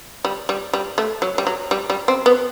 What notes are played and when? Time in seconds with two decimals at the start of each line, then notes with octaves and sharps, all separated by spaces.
0.25 G3
0.49 G3
0.73 G3
0.98 A3
1.22 F#3
1.38 G3
1.47 F#3
1.71 G3
1.90 G3
2.08 C4
2.26 B3